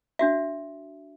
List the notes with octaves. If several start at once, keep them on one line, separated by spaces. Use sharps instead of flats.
D4 F#4 E5